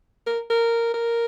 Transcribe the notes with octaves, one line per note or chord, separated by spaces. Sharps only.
A#4
A#4
A#4